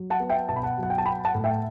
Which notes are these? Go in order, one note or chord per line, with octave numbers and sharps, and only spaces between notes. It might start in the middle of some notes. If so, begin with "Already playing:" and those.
Already playing: F#3
F#5 A5
B3
E5 G5
B2 A5
B5
F#5 A5
F#3 F#5
G5
A5
B3 G5 B5
F#5 A5
A2
E5 G5